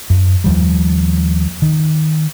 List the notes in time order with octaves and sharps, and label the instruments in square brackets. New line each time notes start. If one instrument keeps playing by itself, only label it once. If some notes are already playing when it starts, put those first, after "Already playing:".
[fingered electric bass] F#2
D#2 F3 G3
D#3